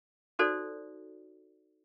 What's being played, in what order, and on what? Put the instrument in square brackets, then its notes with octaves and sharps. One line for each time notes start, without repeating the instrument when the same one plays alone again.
[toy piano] D#4 F#4 A4 C5 D5